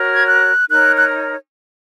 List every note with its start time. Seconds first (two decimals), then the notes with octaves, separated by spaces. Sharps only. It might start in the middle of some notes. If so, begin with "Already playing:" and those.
Already playing: F#4 A#4 C#5
0.14 G#6
0.26 F#6
0.68 D#4 A#4 C#5 F#6
0.97 F#6